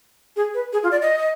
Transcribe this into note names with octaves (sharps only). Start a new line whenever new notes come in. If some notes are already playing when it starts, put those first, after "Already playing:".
G#4
B4
G#4
F4
D5
D#5